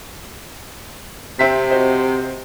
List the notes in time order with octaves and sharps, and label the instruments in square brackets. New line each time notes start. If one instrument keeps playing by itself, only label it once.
[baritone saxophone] C3 [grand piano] C4 E5 B6
[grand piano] F#4 C5 D#5